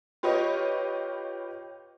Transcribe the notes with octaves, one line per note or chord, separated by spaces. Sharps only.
F4 G4 B4 C#5 D#5